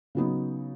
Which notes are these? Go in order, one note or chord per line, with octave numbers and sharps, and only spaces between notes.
C#3 F#3 B3 D#4